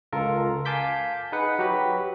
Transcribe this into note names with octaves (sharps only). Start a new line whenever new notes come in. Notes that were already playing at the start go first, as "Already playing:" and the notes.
C#2 F4 A4 A#4
F5 G#5 A5 D6 G6 B6
D#4 G#4 B4 F#5
F#3 F#4 G4 B4